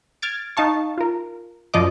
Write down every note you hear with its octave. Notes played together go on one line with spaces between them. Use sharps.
F6 G#6 A6 D7
D#4 F5 A5 C#6
F4 A#4
F#2 F3 D5 D#5 D6